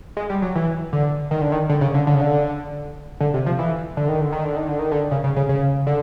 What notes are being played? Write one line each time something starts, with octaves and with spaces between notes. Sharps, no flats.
G#3
G3
F#3
E3
D3
D#3
D3
D#3
D3
C#3
D3
D3
C#3
D3
D3
C3
F3
E3
D3
D#3
D3
D#3
D3
D#3
D3
D#3
D3
C#3
C#3
C#3
C#3
D3